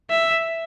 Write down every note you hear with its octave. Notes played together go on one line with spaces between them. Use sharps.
E5